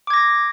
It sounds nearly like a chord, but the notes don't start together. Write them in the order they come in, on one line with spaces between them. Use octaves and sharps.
D6 G#6 A#6